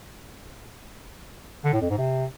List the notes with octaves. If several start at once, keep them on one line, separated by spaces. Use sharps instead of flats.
D3
A2
F2
G#2
C3